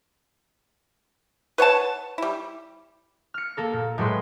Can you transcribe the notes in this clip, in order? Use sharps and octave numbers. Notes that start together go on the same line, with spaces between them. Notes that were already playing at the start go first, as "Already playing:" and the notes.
B4 C#5 F#5 A5
G3 E4
F6 C#7
A#3 A4 A#4
A#2
A2 F#3 G#3 B4 C6